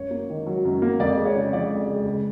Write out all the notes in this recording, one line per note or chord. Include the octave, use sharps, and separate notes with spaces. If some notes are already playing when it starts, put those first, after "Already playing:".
Already playing: F#2 C#5
A#3
D#3
F#3
F#2
A#3
F2 D5
G#3
C#5
C#3
F3 D5
F2
G#3
C#2